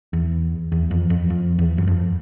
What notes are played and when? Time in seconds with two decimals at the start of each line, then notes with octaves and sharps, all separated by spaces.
0.13 E2
0.72 E2
0.91 F2
1.10 F2
1.30 F2
1.59 E2
1.78 F#2
1.87 F2